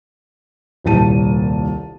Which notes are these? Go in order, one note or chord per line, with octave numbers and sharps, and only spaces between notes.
D#1 C2 A#2 A5 D#7